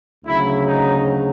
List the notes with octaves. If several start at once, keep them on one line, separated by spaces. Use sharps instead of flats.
D2 C#3 F#3 E4
D#4